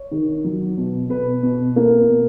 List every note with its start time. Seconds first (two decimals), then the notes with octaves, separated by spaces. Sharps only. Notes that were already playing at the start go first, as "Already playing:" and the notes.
Already playing: C#5
0.11 D#3
0.44 F#3
0.78 B2
1.10 B2 B4
1.43 B2
1.76 A#3
2.09 B2